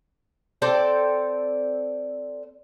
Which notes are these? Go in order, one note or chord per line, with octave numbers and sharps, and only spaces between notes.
C4 A4 D5 G5